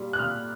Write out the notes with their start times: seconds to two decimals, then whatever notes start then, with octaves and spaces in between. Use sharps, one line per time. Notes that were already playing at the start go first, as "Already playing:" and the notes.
Already playing: A#2 G3
0.13 F#6
0.19 A#2 F6